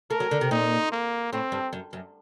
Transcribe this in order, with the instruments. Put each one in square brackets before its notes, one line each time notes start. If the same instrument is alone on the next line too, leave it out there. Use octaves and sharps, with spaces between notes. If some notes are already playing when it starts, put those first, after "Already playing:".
[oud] A3 [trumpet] A#4
[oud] F#3
D3
C3
[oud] A#2 [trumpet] D#4
[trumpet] A#3
[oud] A2 [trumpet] C4
[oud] G2
F#2
F#2